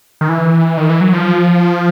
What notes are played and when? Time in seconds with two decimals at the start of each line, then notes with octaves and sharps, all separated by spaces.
0.21 D#3
0.29 E3
0.77 D#3
0.89 E3
1.01 F#3
1.13 F3